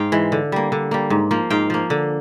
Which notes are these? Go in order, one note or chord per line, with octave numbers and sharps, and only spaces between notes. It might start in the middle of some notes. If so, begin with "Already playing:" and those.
Already playing: G#2 F5 G5
E3 G#3
D3
G3 A#3
D3
G3 A#3
G#2
F3 A#3
G#2 F5 G5
F3 A#3
D3